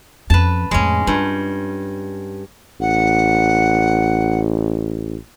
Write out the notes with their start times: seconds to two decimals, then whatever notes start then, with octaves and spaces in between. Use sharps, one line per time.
0.30 F2 C#4 B4 A5
0.71 F2 A2 G#3 C#4
1.07 G2 F4
2.80 A1 F#5